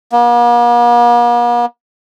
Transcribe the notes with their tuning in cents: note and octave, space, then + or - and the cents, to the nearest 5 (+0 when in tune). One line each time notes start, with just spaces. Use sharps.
A#3 +45